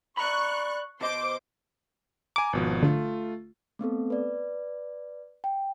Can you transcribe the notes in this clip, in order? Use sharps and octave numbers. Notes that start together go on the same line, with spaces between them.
D5 A#5 B5 C#6 F#6
B2 C5 D#5 D6
G#5 A#5 D6
G#1 B2 F3
D3 A3 F4
A3 B3 C4 A4
B4 D5
G5